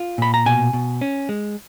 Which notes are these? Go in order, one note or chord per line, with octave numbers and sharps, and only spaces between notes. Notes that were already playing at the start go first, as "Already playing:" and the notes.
Already playing: F4
A#2 B5
A#5
B2 G#5
B2
C#4
G#3